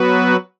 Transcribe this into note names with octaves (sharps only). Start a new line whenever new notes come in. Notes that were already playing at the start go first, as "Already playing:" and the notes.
Already playing: F#3 B3 F#4 B4